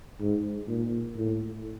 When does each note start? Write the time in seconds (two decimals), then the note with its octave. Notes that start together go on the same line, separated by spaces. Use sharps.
0.20 G#2
0.68 A#2
1.16 A2